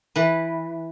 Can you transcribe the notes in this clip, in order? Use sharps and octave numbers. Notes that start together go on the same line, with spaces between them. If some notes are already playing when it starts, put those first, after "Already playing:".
E3 B4